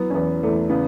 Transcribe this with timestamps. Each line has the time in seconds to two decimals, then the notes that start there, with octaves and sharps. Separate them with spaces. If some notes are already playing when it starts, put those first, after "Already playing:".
Already playing: E3 F#3 B3
0.10 C#4
0.15 E2 B3
0.43 E2 A3
0.70 C#3 B3